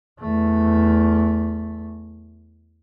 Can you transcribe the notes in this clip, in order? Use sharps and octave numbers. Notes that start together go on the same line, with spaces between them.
E2 A3